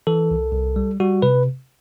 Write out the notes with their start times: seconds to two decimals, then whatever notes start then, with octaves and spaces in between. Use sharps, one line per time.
0.07 E3 A4
0.31 C2
0.53 C2
0.76 G3
1.00 G3 F#4
1.22 C3 B4